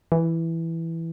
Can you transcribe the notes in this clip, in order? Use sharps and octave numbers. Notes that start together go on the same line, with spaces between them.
E3